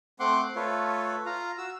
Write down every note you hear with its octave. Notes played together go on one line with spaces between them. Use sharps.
A3 C4 F#5 C6 D6
A3 F4 A4 B4 C#5
F4 F5 A#5
F#4 E6